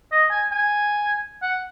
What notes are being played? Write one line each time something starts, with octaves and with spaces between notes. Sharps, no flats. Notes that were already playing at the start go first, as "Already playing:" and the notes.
D#5
G#5
G#5
F#5